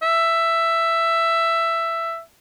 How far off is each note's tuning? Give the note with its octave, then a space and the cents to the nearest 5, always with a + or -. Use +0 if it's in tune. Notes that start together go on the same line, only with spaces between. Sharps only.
E5 +10